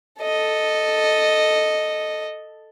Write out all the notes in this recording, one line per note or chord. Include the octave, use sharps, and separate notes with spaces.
A4 D#5